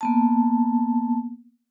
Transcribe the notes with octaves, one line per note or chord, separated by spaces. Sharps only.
A#3 B3 A5